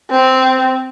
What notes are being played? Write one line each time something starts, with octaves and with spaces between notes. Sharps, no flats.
C4